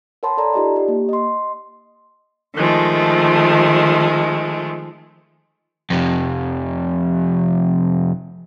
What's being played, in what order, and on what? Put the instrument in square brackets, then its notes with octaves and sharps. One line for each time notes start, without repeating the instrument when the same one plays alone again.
[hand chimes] A#4 C#5 F#5 A5 B5 C6
A4 A#4 D5 A#5
D#4 F4 G4 D5 D#5
G4
A#3
D#5 C6
[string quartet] D#3 F3 G#3 A3
[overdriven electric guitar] F2 C3